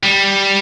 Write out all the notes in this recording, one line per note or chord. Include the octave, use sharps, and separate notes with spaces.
G3